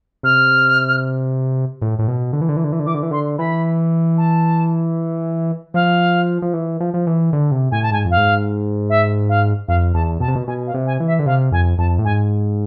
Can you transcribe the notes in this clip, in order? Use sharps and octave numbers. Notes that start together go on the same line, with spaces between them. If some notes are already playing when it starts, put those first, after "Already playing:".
C3 F6
A2
A2
B2
D3
E3
D3
E3
D3
E3
D3
E3 D6
D3
E3
D3 C6
E3 B5
A5
F3 F5
F3
E3
F3
F3
E3
D3
C3
A2 G#5
A5
G#2 G#5
F2
F5
G#2
E5
F5
F2 F5
E2 A5
B2 A5
C3
B2
B2 G#5
F5
C3
G#5
E3
E5
D3
C3 F5
F2 G#5
F2 A5
A2
G#2 G#5